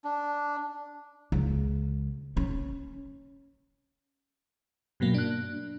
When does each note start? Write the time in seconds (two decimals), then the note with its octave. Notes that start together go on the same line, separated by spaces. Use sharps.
0.04 D4
1.32 C#2
2.37 C#4
5.00 G2 B2 F#3 A#3
5.14 D4 F#6